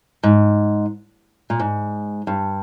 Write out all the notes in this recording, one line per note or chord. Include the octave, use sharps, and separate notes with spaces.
G#2
A#2
G#2
G2